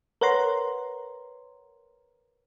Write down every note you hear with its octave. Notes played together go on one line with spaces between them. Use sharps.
A#4 B4 C#5 F#5 A#5 C6